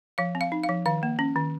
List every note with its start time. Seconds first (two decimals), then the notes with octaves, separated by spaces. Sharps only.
0.18 F3 F5
0.35 C4
0.41 F5
0.52 D#4
0.64 F5
0.69 F3
0.86 D#3 F5
1.03 A#3
1.19 C#4
1.36 D#3